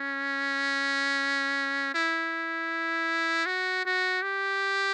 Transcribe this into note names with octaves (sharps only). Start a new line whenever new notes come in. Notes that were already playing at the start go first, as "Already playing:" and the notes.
Already playing: C#4
E4
F#4
F#4
G4